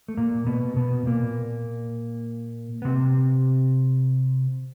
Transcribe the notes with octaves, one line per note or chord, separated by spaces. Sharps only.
A3
A#2 A#3
B2 B3
B2 B3
A#2 A#3
B3
C3 C4